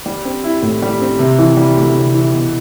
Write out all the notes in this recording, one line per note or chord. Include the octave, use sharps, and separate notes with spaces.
G3
C4
E4
A2
G3
C4
C3
E3
G3
D2
C3
E3
B2